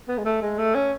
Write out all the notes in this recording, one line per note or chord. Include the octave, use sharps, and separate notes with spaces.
B3
G#3
A3
G#3
A3
C#4